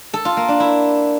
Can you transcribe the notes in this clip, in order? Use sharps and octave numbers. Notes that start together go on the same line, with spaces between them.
A4
F4
A#3
D4
E4